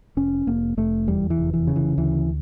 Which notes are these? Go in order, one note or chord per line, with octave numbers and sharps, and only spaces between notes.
F1 C#4
F1 A#3
F1 A3
E2 G3
E3
F1
E3
C#3
E3
D2 E3